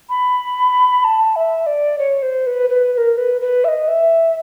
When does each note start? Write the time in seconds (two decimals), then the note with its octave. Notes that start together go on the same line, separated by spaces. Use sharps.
0.10 B5
1.04 A5
1.36 E5
1.67 D5
1.99 C#5
2.22 C5
2.47 B4
2.70 B4
2.93 B4
2.98 A#4
3.18 B4
3.41 B4
3.64 E5
3.68 D#5
3.88 E5